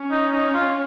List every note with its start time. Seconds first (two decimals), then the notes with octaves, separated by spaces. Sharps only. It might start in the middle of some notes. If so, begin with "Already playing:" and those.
Already playing: C#4
0.11 D#4
0.32 D#4
0.54 F4